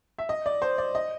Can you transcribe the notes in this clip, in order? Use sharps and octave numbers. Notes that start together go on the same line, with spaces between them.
E5
D#5
D5
C5
D5
D#5